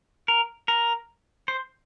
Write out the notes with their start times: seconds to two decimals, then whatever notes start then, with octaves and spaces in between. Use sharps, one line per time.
0.28 A#4
0.68 A#4
1.48 C5